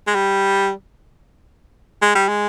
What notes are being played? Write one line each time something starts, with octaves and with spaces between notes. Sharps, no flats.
G#3
G3
G#3
G3
G#3